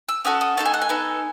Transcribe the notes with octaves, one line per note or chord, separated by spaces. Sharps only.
E6
C#4 F#4 A4 D#6
D#6
A3 D#4 A4 A5
G#5
F#5
G#5
B3 D#4 A4